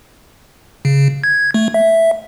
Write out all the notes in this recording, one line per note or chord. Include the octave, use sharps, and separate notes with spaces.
C#3
G#6
A3
E5